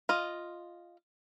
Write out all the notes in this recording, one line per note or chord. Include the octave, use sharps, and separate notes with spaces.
F4 D#5